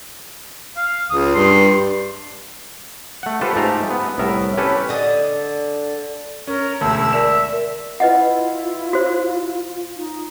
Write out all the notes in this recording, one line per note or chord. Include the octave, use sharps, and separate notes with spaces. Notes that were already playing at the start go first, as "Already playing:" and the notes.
F5
C#2 D#6
G2 C6
A3 F#5
F4 G4 A4 B4 C5
G#2 A3 F4 G4 A5 A#5
B3
C2 A2 B3 A#4 E5
C#4 G4 A4 B4
D3 D#5
C#4 A#4
E1 D2 A5 E6
A#4 D5 E5 E7
E4 F4 B4 D#5 F#5
F#4 C5
D#4